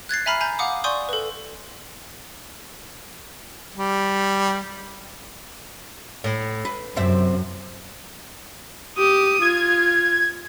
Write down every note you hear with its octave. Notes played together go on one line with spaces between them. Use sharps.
F#6 G#6 A6 C7
E5 G#5 A#5 B5 F6 C7
G#5 A#5 G6
F5 F#5 D6 D#6
D5 G#5 C6 C#6 D#6 G6
A4 B4
G3
A2
B4
F#2 C3 C4 E5
G4 D#6
F4 G#6